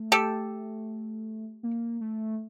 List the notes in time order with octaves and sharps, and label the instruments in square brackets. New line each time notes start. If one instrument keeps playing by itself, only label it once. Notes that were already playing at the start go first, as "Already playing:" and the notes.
Already playing: [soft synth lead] A3
[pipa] G4 A4
[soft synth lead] A#3
A3